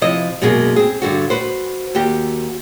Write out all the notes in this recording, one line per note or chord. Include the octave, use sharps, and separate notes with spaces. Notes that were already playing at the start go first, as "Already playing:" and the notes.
C3 F3 E4 D#5
F#2 B2 G#3 A#3 G#4
C4 G#4
G2 D3 F#4
F#4 B4 C5
D#2 F#4 G4